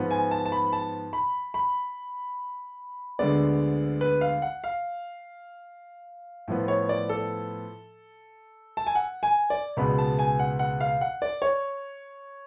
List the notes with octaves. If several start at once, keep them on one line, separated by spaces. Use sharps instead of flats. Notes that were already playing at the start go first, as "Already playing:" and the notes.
Already playing: G#2 F3 B3
G#5
A5
A5
B5
A5
B5
B5
D2 D3 G#3 B3 D5
B4
F5
F#5
F5
A2 F3 B3
C#5
D5
A4
A5
G#5
F#5
G#5
D5
C#2 B2 G#3 B3 B5
A5
G#5
F#5
F#5
F5
F#5
D5
C#5